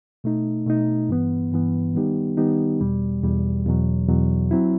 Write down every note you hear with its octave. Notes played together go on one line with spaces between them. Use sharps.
B2 A3 D#4
B2 A3 D#4
G2 E3 B3
G2 E3 B3
D#3 G3 B3 D#4 G4
D#3 G3 B3 D#4 G4
E2 B2 G3
E2 B2 G3
E2 B2 F#3
E2 B2 F#3
F#3 C4 E4